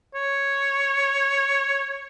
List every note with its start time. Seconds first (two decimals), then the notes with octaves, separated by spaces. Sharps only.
0.15 C#5